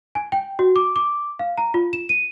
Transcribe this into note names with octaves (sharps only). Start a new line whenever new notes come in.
G#5
G5
F#4
D6
D6
F5
A#5
F4
E7
D#7